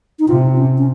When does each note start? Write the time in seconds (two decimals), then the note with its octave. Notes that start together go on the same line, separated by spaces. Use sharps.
0.19 D#4
0.28 C3 F4
0.57 C#4
0.78 C#4